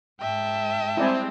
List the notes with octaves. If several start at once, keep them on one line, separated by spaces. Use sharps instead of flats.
G#2 E5 G5 A5
G3 G#3 C4 E4 D5 G#5